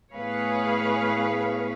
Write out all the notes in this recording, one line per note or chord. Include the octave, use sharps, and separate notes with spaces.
A2 B3 G#4 B4 C#5 F5